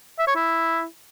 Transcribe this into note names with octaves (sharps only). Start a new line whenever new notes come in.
E5
C#5
E4